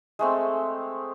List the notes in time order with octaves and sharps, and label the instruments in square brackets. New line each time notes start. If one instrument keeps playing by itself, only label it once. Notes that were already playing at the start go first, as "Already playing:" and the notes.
[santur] G#3 A3 C4